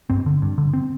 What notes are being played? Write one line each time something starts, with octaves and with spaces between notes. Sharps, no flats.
G2 C4
D3
G2
D3
C4